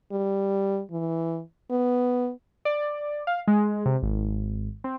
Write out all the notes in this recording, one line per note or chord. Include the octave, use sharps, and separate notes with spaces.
G3
E3
B3
D5
F5
G#3
C3
G#1
C4